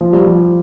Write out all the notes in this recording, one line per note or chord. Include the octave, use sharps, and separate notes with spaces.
F3
G3
F3